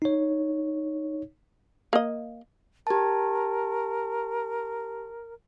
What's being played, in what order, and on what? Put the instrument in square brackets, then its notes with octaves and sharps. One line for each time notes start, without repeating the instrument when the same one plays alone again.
[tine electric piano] D#4 C#5
[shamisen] A#3 D#5
[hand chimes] G4 A5 [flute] A#4